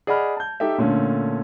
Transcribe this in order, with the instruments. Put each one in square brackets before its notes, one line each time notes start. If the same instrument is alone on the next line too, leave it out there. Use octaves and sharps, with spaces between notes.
[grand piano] G#4 D5 D#5 F#5 B5 F6
A5 G6
D#4 G4 A4 E5
A#2 D3 A3 C#4